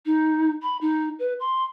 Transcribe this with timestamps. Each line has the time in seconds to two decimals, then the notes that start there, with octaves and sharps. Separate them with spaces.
0.06 D#4
0.62 B5
0.81 D#4
1.19 B4
1.40 C6